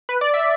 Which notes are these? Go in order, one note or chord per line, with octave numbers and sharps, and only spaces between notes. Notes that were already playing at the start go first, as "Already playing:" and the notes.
B4
D5
E5